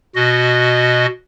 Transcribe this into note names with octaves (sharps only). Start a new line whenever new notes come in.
B2 F#4 D#5